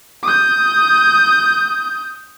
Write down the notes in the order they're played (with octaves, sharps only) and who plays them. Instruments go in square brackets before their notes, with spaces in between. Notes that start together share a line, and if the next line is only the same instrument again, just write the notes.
[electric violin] D#6 G6